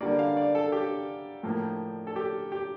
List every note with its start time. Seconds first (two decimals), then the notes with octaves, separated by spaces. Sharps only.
0.01 D3 G3 A#3 D5
0.19 F5
0.37 D5
0.55 A4
0.72 G4
1.43 A2 F3 A#3
2.07 A4
2.16 G4
2.52 G4